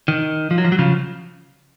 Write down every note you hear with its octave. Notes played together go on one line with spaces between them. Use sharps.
D#3
F3
F#3
F3
F#3
C#3 F3